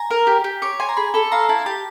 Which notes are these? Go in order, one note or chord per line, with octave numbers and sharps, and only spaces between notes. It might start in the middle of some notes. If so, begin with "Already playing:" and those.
Already playing: G#5 A#5
A#4
G4
G4
C#5 D6
G#5 C6
A#5
G#4 B5
A4 B5
F5 A#5
E4 A5
G4 A5